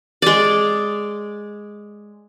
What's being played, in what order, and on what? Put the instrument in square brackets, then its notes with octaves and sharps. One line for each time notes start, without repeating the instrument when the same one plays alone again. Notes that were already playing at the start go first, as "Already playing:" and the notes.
[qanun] G#3 D5